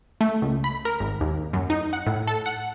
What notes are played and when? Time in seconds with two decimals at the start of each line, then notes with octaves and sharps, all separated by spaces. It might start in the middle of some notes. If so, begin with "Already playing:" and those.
0.21 A3
0.42 C#2
0.64 B5
0.85 A#4
1.00 G#1
1.21 D#2
1.53 F#2
1.70 D#4
1.93 F#5
2.06 A2
2.27 A4
2.46 F#5